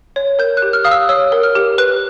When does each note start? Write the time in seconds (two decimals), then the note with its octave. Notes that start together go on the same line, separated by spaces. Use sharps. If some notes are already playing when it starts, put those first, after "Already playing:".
0.16 C#5
0.39 A#4 G6
0.57 F#6
0.62 G4
0.73 F6
0.84 F5 D#6
0.91 E6
1.09 C#5 E6
1.32 A#4
1.43 F6
1.55 G4
1.78 B4 F#6